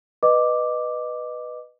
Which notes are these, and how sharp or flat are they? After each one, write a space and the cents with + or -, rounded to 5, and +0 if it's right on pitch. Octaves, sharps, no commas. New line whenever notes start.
B4 +0 D#5 -15 D6 +0